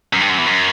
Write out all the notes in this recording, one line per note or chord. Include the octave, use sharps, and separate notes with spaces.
F#2
G2
F#2
E2
F#2